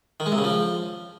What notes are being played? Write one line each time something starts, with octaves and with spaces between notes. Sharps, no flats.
D#3
G#3
C3
C#3
F3